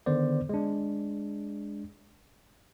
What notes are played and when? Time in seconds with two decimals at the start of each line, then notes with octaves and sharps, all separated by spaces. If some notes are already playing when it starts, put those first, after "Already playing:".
0.06 D3 D#3 B3 C5 D5
0.49 G#3 D4